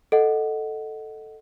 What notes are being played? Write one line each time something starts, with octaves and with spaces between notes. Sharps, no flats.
A4 D#5 F#5